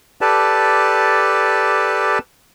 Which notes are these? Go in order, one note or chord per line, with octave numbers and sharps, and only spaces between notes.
G4 A4 B4 D5 A5